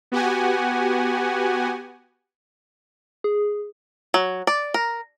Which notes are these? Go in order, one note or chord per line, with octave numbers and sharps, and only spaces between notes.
B3 F#4 G4 F#5 G#5
G#4
F#3
D5
A#4